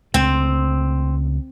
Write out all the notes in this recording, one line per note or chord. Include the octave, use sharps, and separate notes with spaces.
C#2 A3 C4